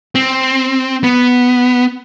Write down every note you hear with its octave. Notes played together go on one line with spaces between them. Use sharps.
C4
B3